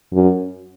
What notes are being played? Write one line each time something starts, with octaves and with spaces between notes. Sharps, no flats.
F#2